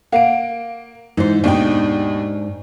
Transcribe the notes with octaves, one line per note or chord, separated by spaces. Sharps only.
A#3 F5 F#5 D7
G#2 E3 D#4 C5
D#2 G#2 B2 D4 D#4 G5